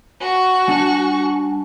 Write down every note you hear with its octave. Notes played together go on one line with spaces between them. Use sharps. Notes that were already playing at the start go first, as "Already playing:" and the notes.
F#4 G#5 C#6
G3 D4 A5